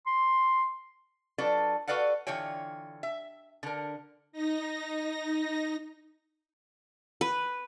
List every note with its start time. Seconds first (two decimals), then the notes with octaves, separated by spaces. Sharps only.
0.07 C6
1.38 F#3 D4 F4 A4 B4 D5
1.88 F#4 A4 B4 D5 F5 F#5
2.27 D3 E3 F4 C#5 G5
3.03 E5
3.63 D3 A#4
4.32 D#4 A#6
7.21 B4